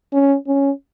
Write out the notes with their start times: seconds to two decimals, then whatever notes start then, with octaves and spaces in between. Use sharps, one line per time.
0.13 C#4
0.47 C#4